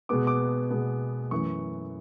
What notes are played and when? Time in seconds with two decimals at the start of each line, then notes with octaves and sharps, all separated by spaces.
0.09 B2 G#3 B3 D6
0.27 D6
0.70 B2 G#3 B3
1.31 F#2 E3 A3 C#6